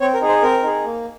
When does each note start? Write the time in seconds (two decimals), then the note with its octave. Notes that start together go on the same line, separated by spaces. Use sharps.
0.01 C4 C#5
0.14 A#4
0.21 D#4 G#4
0.29 C5
0.42 C4 A#4
0.63 D#4 G#4
0.85 A#3